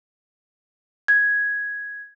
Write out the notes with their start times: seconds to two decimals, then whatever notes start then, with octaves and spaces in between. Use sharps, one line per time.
1.08 G#6